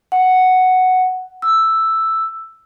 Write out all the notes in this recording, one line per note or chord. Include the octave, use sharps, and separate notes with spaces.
F#5
E6